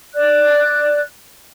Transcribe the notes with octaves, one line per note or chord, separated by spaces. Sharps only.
D5 F#6